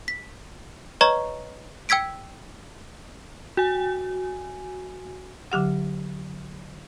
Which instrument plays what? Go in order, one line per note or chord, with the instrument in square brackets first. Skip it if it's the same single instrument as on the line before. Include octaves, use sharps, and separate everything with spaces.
[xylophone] B6
B4 C#5 D#5 A#5 C#6 G#6
G5 E6 G#6 B6 D7
[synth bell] F#4 G#5
[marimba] D3 F#3 G4 F#5